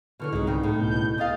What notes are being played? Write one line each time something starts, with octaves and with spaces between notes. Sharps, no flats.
B2 D3 E3 F#3 C#6 F6
C2 G#2 F#3 G#3 D#4
C#3 G5
A2
C#2 B2 G6
C3 D#5 F5 D#6 A6